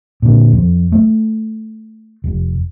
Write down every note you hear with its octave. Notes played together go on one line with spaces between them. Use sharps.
A#2 D3
F2
A3
F1